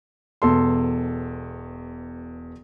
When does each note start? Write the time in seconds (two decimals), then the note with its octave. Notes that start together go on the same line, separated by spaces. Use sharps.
0.42 E1 E2 A4 C6